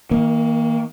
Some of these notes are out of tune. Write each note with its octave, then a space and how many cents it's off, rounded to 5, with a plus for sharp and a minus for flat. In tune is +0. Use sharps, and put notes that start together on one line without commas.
D#3 +40 A#3 +0